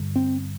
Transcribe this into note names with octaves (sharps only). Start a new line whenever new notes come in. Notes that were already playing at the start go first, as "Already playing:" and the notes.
Already playing: G2 D3
C4